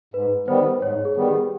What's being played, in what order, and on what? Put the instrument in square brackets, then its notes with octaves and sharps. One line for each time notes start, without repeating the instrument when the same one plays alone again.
[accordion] G#2 [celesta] B4
[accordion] D#3 G3 B3 [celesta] C5
[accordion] G#2 [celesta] C#5
[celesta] G#4
[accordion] D#3 G3 B3
[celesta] G4